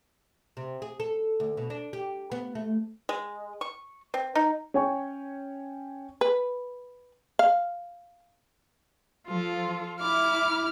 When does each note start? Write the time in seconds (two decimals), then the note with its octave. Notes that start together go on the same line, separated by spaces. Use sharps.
0.57 C3
0.82 G#4
1.00 A4
1.40 D2
1.57 B2
1.70 D4
1.93 G4
2.32 B3
2.55 A3
3.09 G#3
3.61 C#6
4.14 C4
4.35 D#4
4.74 C#4 C#5 G5 G#5 C#6
6.21 B4
7.39 F5
9.28 F3 F4 A4
10.01 E4 D6 F6